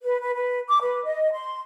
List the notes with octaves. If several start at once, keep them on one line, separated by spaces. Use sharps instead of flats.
B4
B4
B4
D6
B4
D#5
C6